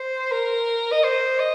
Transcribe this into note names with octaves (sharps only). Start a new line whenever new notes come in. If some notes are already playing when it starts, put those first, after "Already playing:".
Already playing: C5
A#4
D#5
C5
D#5